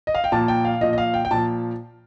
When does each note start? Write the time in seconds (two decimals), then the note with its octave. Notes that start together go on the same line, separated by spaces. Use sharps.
0.07 D#5
0.15 F5
0.24 G5
0.32 A#2 F3 A5
0.48 G5
0.65 F5
0.81 A#2 F3 D#5
0.93 D#5
0.98 F5
1.14 G5
1.25 G5
1.31 A#2 F3 A5